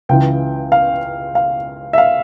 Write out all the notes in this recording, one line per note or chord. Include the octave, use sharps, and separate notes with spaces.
C#2 C#3 E3 G5
F5
F5
E5
F5